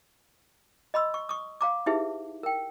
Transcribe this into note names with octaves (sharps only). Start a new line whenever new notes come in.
D#5 B5 C6 E6
C#6
C#6 D#6
F5 A#5 D6
D#4 E4 G4 G#4 B4 E5
A#4 G5